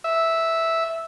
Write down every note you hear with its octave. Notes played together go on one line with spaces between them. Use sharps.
E5